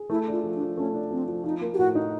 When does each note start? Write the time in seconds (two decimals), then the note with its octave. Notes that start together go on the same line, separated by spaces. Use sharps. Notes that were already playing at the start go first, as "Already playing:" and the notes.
Already playing: G#4
0.10 A3 E4
0.28 D4 F4
0.44 F3
0.55 D4
0.61 F3
0.77 A3 C#4
0.94 D4
1.11 F3 C4
1.28 F3
1.44 F3 D#4
1.61 A#3
1.74 G4
1.78 A2 F#4
1.95 D#4